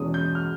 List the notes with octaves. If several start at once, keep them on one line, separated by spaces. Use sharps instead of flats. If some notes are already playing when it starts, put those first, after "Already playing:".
Already playing: E2 B2 G#3 C#4 D#6
G6
F6